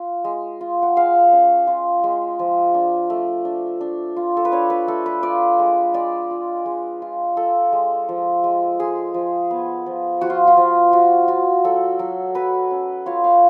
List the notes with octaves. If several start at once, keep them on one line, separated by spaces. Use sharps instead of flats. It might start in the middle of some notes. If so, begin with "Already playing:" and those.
Already playing: F4
G#3
F4
F#5
G#3 F5
C#4
F4
G#3
F3
D4
A3
D4
D4
F4
A4
B4
D4 C#5
B4
A3 A4
B4
F4 D5
G#3
G#3 D5
F4
G#3
F4
F4 A4
G#3
F3
G#3
G#3 G#4
F3
B3
F3
F3 F#4
F4
F4
F3
F4 F#4
F4 F#4
F#3 A4
F#3
F#3 B4
C#4
F4 C#5
F5